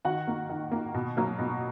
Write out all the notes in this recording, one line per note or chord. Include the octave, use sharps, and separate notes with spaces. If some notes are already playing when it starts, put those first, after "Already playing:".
D#3 F#4 F#5
A#3
D#3
A#3
B2
F#3 A#3
B2